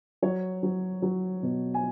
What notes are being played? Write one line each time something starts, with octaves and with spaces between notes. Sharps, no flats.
F#3 C#5
F#3
F#3
B2
G#5